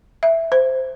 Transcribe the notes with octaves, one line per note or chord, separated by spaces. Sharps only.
E5
C5